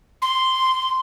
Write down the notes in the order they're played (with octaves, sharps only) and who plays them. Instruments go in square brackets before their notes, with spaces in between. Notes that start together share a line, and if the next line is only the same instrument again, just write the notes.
[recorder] C6